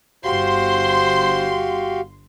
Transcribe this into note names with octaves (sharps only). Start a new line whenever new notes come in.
G1 F#4 G4 C5 F5 C6